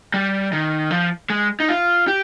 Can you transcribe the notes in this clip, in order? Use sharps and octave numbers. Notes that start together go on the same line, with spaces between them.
G3
D#3
F3
G#3
D#4
F4
G4